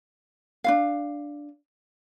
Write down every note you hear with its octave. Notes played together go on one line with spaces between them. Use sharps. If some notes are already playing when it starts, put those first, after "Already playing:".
D4 F4 F5